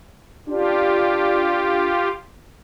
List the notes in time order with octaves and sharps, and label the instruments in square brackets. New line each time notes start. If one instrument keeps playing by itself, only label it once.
[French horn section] D4 [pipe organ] F4 G4